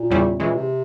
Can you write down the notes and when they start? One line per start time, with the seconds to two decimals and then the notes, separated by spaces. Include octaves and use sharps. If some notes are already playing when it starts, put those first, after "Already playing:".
Already playing: A#2
0.10 E2 C#3 G3 C#4 E4
0.40 A#2 E3 G#3 C#4
0.55 C3